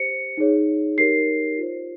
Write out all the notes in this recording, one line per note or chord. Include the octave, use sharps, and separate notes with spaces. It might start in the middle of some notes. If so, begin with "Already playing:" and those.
Already playing: G4 C5 C#7
D#4 G#4 C#5
D#4 G4 A#4 C#5 C7
F4 C5